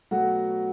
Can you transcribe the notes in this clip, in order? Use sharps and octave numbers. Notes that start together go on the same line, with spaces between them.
B2 F#3 A3 F#4 F#5